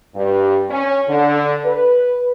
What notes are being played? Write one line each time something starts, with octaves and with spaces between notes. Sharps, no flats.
G2
C#4
D3
B4